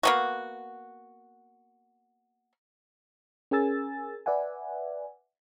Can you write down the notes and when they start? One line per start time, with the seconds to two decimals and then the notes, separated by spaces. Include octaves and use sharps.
0.03 A#3 B3 F#4
3.51 C#4 G#4 A#4 G#5 E6 A6
4.26 B4 D5 E5 F#5 G#5